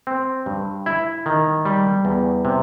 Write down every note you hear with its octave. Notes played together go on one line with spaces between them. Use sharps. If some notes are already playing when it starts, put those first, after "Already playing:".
C4
G2
E4
D#3
G3
E2
C3